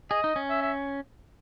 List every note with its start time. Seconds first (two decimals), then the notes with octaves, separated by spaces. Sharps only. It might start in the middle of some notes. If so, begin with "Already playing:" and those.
0.11 G#4 D#5
0.24 D#4
0.36 C#4
0.50 E5
0.62 E5